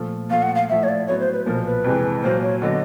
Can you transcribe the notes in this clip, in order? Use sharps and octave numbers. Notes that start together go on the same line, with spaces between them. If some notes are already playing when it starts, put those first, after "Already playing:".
Already playing: A#2 F3 A3
A#2 F3 A3 F5
F#5
F5
A2 F3 A3 E5
C#5
D5
A2 F#3 B3 C#5
C5
B4
B1 A#2 F3 A#4
B4
F2 C3 E3 G#3
A#2 F#3 A#3 C5
C#5
D3 F#3 B3 D#5